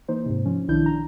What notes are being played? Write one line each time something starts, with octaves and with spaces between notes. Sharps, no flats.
E3 A#3 D#4 C5
G#2 C3
F3 C#4
B1 D#3 D4 E4 G6
A#5